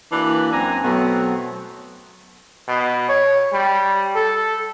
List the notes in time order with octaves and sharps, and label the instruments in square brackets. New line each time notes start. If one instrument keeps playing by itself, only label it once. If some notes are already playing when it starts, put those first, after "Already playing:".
[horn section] E3 A#3 D4 F#4 B4
F#2 C4 D4 G#5 A#5
B2 F#3 A3 B3 C4
[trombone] B2
C#5
G3
A4